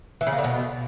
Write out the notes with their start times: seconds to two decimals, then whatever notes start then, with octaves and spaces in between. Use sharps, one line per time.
0.21 E3
0.27 C#3
0.32 A#3
0.38 D3
0.44 B2